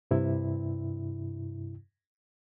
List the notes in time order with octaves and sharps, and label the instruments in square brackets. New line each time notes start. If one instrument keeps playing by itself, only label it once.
[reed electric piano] G2 C3 E4